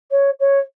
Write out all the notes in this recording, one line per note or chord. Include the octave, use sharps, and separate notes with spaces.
C#5
C#5